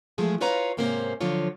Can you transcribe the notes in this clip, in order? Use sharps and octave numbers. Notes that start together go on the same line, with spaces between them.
E3 F3 G#3 A3 G#4
E4 F4 B4 C#5 F5 A#5
G#2 C3 A#3 C#4 F4 C5
D3 F3 F#3 F4 C#5